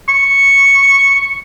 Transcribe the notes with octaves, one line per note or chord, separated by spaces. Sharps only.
C#6